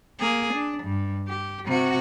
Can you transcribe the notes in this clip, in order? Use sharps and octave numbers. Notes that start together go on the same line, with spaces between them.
A#3 G#4
D4
G2
G4
C3 F#4